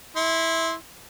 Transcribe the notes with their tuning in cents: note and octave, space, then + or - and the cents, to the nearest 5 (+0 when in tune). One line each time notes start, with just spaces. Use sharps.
E4 -15 C6 +0